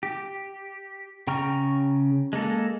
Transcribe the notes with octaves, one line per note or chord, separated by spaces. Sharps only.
G4
C#3 G5 A#5 C#6 F6
G#3 A#3 A4